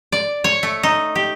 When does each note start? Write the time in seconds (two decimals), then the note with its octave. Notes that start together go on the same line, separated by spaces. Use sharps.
0.12 D5
0.44 C#5
0.63 A3
0.83 D#4
1.15 G4